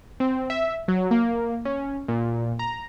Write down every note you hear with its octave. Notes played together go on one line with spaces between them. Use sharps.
C4
E5
F#3
A#3
C#4
A#2
A#5